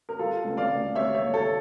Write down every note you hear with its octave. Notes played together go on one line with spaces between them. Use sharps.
A#4
G3 F4 A4
C#2
D5 F5
C#2
G3 C#5 E5
C#5 E5
A#3
A4 C#5